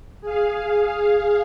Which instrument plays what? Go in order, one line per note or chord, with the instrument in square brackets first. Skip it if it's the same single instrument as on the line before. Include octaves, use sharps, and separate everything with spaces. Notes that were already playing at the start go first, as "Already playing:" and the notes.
[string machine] G#4 F5